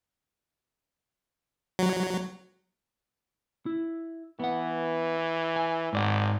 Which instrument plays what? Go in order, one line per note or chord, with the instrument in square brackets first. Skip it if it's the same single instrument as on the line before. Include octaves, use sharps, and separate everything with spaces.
[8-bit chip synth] F#3
[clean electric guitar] E4
[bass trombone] E3 [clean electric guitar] B3 F#5
[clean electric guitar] G#5
[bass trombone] G#1 [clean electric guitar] G#2 D5 F#5